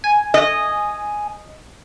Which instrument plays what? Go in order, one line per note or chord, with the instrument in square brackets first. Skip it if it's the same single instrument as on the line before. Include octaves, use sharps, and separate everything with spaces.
[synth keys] G#5
[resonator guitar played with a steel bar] D#5